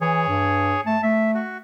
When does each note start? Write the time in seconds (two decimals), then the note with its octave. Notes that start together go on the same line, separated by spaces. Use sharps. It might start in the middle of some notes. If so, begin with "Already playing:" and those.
0.01 E3 G#4 C#5
0.28 G2
0.86 A3 A5
1.03 A3 E5
1.34 F#4